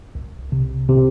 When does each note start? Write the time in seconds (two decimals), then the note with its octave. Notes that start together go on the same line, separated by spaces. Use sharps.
0.15 C2
0.52 C3
0.89 C3